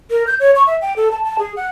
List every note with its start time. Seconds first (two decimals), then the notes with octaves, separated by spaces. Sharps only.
0.10 A#4
0.27 G6
0.40 C#5
0.56 C#6
0.67 E5
0.82 G5
0.96 A4
1.12 A5
1.24 A5
1.39 G#4
1.56 F#5